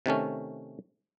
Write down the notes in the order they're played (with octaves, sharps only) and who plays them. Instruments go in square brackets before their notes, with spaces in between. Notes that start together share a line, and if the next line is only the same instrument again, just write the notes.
[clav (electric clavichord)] C3 D#3 A3 C#4